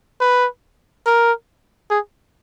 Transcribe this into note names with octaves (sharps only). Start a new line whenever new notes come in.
B4
A#4
G#4